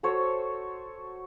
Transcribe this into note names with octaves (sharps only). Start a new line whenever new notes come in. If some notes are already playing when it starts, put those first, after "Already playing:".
F#4 A4 C5 C#5